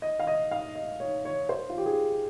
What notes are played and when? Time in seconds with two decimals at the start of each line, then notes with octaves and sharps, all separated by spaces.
0.02 D#5
0.20 F5
0.27 D#5
0.51 F5
0.75 D#5
1.00 C#5
1.25 C#5
1.49 C5
1.69 F4
1.78 G4
1.86 G#4